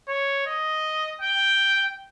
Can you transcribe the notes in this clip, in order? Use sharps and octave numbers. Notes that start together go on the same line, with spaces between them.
C#5
D#5
G5